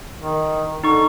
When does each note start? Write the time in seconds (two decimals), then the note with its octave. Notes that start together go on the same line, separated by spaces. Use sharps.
0.18 D#3
0.84 D3 D#4 C#6